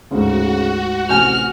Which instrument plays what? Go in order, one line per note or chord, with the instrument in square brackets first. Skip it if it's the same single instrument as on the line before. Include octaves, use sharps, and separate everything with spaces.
[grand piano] D2 G#2 [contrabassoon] C#3 [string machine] F#4
[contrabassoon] A1 [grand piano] C3 G#5 G6 [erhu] F6